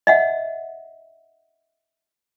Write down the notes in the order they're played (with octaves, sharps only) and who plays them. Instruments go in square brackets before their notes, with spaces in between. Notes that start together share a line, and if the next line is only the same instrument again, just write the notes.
[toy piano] D#5 E5 F#5